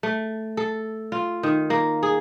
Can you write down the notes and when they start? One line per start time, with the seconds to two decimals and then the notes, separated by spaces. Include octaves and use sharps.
0.03 A3
0.57 A4
1.12 F4
1.43 D#3
1.70 A#3
2.03 G#4